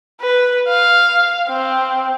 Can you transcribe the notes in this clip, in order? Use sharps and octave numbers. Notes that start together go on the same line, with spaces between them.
B4
F5
C4